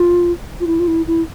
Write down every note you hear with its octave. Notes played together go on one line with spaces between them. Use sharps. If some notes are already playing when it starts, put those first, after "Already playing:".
Already playing: F4
F4
E4
F4
E4
E4